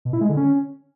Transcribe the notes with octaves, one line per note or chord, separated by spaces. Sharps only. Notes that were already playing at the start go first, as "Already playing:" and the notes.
B2
E4
G#3
D3
C#4